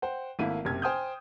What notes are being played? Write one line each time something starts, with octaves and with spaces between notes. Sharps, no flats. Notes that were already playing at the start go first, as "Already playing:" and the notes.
C5 F#5 G5
G#1 A3 A#3 E4 D#7
F#1 C3 G4 G#6
C5 G5 G#5 D#6 F6 G6